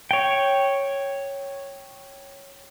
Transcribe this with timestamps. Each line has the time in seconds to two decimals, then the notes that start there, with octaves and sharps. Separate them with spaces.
0.11 C#5 G5